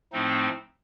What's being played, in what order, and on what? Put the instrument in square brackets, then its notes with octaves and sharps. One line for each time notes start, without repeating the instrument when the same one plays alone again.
[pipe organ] A2 F3 A3 C4 D#4